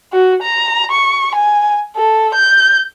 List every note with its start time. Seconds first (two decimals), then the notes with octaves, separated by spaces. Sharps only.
0.13 F#4
0.42 A#5
0.91 C#6
1.35 G#5
1.96 A4
2.34 G6